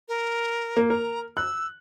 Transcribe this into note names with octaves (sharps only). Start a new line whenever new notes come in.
A#4
A#3
A#4 A#5
E6 F#6